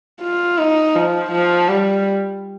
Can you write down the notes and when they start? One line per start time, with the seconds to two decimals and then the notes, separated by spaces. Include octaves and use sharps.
0.21 F4
0.58 D#4
0.95 F3
1.32 F3
1.69 G3